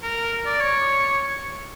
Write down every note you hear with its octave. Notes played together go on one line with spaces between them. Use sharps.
A#4
D5
C#5